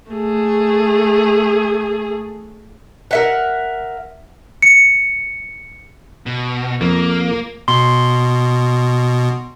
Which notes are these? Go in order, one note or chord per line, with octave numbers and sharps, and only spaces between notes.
A3 G#4
A#4 E5 F#5
C#7
B2
F2 A#3
B2 C6